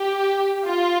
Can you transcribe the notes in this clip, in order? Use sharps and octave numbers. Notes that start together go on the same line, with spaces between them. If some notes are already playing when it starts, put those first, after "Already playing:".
Already playing: G4
F4